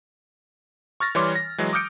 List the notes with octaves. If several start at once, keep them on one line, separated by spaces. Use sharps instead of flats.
C#6 F6 A6 A#6
E3 G3 C#5 C6 D6
A#6
E3 F#3 G#3
D6 D#6 F6 G6 C#7 D7